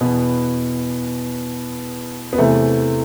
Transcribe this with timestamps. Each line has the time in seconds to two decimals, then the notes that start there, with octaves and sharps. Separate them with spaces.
0.01 E2 B2 B3
2.33 B3
2.38 E2 C3 E3 A3